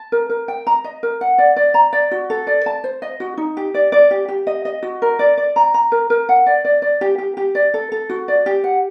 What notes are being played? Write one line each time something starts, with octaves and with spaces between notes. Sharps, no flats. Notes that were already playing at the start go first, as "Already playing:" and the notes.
Already playing: A5
A#4
A#4
G5
A#5
D#5
A#4
F#5
D5
D5
A#5
D5
F#4
A4
D5
A5
C5
D#5
F#4
D#4
G4
D5
D5
G4
G4
D#5
D#5
F#4
A#4
D5
D5
A#5
A#5
A#4
A#4
F#5
D5
D5
D5
G4
G4
G4
D5
A4
A4
F#4
D5
G4
F#5